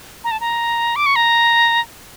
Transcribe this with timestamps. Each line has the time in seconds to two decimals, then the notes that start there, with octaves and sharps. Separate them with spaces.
0.24 A#5
0.31 A5
0.41 A#5
0.96 D6
1.06 C#6
1.16 A#5